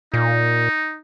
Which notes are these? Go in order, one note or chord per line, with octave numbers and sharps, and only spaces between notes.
A#2 D#4